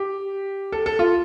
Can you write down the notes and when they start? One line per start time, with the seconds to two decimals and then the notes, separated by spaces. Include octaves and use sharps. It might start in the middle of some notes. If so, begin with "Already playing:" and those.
Already playing: G4
0.72 A4
0.86 A4
0.99 F4